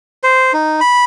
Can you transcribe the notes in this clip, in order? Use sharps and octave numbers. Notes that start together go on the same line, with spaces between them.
C5
D#4
B5